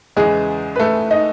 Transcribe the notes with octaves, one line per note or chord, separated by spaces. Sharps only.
E2 C#3 E3 G#3 G#4
B4
A3 A4
D#4 D#5